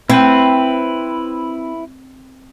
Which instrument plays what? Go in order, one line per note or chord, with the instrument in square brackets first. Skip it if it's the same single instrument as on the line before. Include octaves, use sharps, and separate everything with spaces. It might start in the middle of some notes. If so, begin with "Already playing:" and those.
[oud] C4 [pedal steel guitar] E4 B4